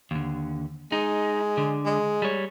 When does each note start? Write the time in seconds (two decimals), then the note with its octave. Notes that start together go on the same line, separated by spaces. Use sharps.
0.11 D#2 D3
0.92 G#3 D#4
1.57 D3
1.85 G#3
2.22 G3 C#5